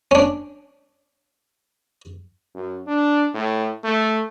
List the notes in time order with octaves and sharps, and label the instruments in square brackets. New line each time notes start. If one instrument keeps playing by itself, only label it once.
[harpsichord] C#4 D4
[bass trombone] F#2
D4
A2
A3